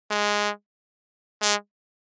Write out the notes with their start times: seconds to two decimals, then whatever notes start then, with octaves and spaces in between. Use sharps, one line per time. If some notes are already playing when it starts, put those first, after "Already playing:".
0.11 G#3
1.41 G#3